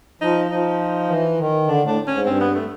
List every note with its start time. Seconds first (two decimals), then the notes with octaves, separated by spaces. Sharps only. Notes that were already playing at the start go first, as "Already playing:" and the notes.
0.21 F3 D#4
0.51 F3 D#4
1.09 E3
1.39 D#3
1.68 D3 D4
1.82 A2 D4
2.07 G#2 C#4
2.26 G2 C4
2.41 B3
2.55 A3